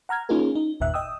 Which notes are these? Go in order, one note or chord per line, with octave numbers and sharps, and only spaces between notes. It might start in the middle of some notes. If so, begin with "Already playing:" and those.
F#5 A#5 F6 G#6
A#3 C#4 D#4 F4 G#4 A#4
D#4
G1 D#2 A#2 E5 F#6
D#5 G5 D#6 E6